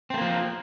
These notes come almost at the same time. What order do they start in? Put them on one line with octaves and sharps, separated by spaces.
C4 A3 A#3 F3